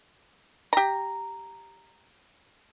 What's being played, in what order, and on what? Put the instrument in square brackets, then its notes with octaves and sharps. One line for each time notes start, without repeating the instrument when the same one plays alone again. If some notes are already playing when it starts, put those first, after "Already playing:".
[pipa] G4 A#5